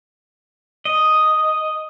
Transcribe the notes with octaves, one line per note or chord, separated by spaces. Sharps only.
D#5